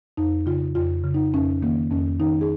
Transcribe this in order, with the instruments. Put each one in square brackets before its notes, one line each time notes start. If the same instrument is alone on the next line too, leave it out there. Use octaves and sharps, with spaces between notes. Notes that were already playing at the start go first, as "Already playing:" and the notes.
[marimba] F2 D#4
C#3 F4
F2 F4
C#3
D#4
F2 C#4
D#3 A#3
F2 C#4
D#3 D#4
G#4